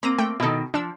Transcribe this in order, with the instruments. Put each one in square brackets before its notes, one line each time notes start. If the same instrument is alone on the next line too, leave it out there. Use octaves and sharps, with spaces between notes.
[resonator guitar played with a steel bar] A#3 C4 [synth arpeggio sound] A#5 A#6 D#7
[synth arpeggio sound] A3 G5
[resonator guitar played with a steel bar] B2 D#3 [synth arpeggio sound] E4 A4
[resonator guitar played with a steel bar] F3 [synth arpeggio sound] D4 E6